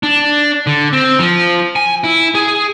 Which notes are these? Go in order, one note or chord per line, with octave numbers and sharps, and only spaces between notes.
D4
D3
C4
F3
G#5
E4
G#4